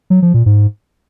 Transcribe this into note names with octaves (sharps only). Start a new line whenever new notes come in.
F#3
F3
A#2
G#2